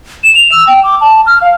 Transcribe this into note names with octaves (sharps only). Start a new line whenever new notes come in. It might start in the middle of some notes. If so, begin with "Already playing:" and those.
E7
F7
E6
G5
D6
A5
F6
F5